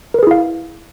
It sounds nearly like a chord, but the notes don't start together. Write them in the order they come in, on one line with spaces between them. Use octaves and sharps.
A#4 B4 G#4 E4 F5